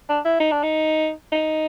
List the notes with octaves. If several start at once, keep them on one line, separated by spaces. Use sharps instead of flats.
D4
E4
D#4
D4
D#4
D#4